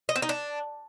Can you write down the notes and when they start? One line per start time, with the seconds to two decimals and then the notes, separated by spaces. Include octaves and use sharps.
0.09 D#5
0.16 C4
0.22 D#4
0.29 D4